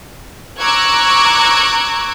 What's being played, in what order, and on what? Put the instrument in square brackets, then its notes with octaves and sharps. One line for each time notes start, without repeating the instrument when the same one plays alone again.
[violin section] A#5 C#6 D6 E6 F#6 G#6